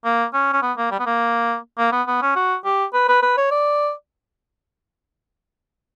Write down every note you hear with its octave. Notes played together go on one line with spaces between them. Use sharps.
A#3
C#4
C#4
B3
A#3
G3
B3
A#3
A#3
B3
B3
C#4
F#4
G4
B4
B4
B4
C#5
D5